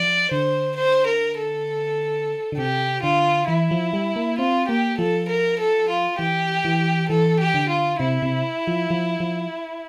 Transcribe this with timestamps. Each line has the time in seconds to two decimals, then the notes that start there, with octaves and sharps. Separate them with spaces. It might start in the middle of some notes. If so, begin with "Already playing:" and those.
Already playing: F3 D5
0.31 D3 C5
0.77 C5
1.07 A#4
1.37 A4
2.52 D3
2.57 C3 G4
3.03 D3 F4
3.48 E3 E4
3.71 F3
3.93 G3
4.16 A#3
4.39 C4 F4
4.68 A#3 G4
4.98 F3 A4
5.29 A#4
5.60 A4
5.90 F4
6.19 E3 G4
6.65 E3
7.09 E3 A4
7.40 G4
7.54 D3
7.70 F4
8.00 C3 E4
8.22 C3
8.67 F3
8.90 F3
9.20 F3